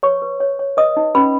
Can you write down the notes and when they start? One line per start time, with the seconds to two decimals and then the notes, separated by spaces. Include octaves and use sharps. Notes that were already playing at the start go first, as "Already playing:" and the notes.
0.03 B4 C#5 C#6
0.22 B4
0.40 C#5
0.59 C#5
0.77 B4 D#5 D#6
0.97 D#4
1.15 C#4 B4 B5